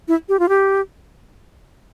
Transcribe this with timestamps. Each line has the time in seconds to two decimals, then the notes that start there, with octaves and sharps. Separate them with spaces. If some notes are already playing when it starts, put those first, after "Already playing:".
0.08 E4
0.29 G4
0.39 F4
0.49 G4